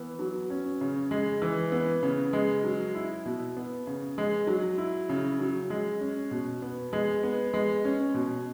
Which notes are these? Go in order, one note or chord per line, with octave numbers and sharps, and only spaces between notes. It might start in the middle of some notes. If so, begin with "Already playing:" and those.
Already playing: E3 B3
F#3
C#4
C#3
G#3
E3
B3
C#3
G#3
F#3
E4
B2
B3
C#3
G#3
F#3
E4
C#3
F#3
G#3
C#4
B2
B3
G#3
B3
G#3
C#4
B2